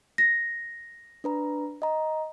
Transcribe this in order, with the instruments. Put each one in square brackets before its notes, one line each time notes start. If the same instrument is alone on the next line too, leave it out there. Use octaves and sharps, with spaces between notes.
[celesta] A#6
[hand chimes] D4 B4 A#5
D#5 A#5